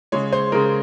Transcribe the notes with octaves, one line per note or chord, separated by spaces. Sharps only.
C#3 G#3 C#5
C5
C#3 G#3 A#4